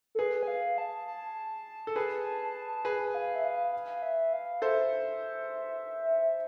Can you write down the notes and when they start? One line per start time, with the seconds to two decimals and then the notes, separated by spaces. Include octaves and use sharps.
0.15 A4
0.19 G#4 B4
0.43 G#5
0.48 F5
0.78 A5
1.07 A5
1.87 A4
1.96 G#4 B4
2.85 G#4 B4 G#5
3.15 F5
3.35 E5
3.44 F5
3.73 F5
4.02 E5
4.33 F5
4.62 A4 C5 E5